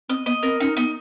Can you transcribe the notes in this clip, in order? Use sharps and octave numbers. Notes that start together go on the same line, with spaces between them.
C4 D#5
B3 D#5
C4 A#4
C#4 D#4
B3 D#4